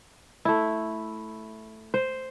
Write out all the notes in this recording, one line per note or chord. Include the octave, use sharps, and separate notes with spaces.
A3 E4
C5